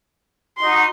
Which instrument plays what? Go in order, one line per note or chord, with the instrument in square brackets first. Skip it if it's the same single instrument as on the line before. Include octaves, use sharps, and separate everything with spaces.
[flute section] D#4 F#4 [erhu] C6